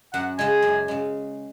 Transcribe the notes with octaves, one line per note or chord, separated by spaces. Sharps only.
F#2 F#5
C#3 G#3 G#5
F#2
C#3 G#3